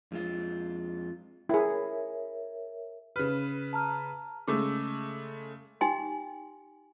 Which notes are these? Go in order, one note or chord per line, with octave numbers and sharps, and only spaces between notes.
F2 G#3 F4
E4 G#4 A#4 C#5 E5
C#3 B4 F6
A5 A#5 F6
C#3 G#3 A3 D6 E6
D#4 G4 G5 G#5 C6